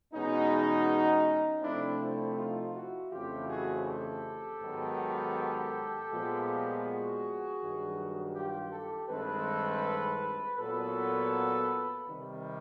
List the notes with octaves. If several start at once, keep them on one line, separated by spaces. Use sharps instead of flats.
E2 B2 G#3 B3 C#4 D#4
C3 F3 A3 C4 D4 E4
D4 E4
D#4 F4
E4 F#4
F2 C#3 E3 A3 C4 F4 G4
F#4 G#4
G4 A4
G#2 D#3 F#3 B3
A#2 F3 G#3 B3
F#4 G#4
G2 D#3 F#3
F4 G4
G4 A4
G2 D#3 G#3 C4 A4 B4
A#2 F#3 B3 A4 B4
C3 D#3 G3